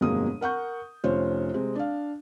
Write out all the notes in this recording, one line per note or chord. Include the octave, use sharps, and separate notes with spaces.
G1 F2 B2 G#3 A#3 D#6
A#4 F#5 C#6 G6
F1 C#4 F4 C5 C#5
C3 G#3 C4
D4 F5